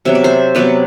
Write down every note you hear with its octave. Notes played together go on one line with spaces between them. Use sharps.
C3 F#3 B3 E5
D5
C5 E5
C3 F#3 B3 B4 D5